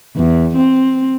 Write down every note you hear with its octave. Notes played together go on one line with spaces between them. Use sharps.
E2
C4